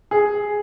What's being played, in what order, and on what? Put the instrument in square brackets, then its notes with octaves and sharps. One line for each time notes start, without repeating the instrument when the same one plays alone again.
[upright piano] G#4